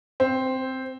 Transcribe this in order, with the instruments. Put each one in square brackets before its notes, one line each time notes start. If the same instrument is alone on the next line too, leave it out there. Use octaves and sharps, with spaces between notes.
[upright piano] C4